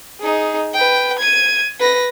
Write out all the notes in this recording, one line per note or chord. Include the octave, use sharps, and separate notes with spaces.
D#4 G#4
B4 G5
G#6 D#7
B4 A#6